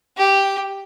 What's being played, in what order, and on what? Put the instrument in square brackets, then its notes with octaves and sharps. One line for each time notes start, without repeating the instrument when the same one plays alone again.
[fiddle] G4